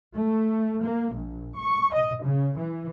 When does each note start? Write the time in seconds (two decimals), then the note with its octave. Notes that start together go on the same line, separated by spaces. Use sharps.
0.15 A3
0.82 A#3
1.14 A#1
1.56 C#6
1.94 D#5
2.24 C#3
2.58 E3